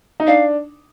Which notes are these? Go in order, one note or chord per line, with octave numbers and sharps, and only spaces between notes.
D#4
D4 F5